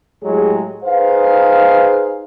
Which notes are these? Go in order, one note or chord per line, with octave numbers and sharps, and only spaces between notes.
A2 F#3 G#3 G4 G#4
D#4 G#4 B4 C5 F5